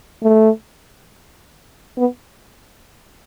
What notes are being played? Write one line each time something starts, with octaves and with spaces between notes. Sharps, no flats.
A3
B3